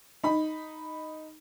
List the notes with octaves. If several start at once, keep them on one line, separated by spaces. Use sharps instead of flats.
D#4 B5